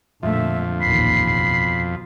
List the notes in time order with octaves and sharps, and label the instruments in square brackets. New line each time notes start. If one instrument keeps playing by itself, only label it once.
[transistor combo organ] F2 [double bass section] A#2 D3 A3 [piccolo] E5
[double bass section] A1 D#2 A#2 [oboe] B5 [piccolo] C7
[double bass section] B2